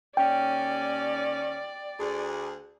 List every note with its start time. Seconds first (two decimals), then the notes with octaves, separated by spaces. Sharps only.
0.17 D#2 C#4 D5 G5
1.99 D2 G#4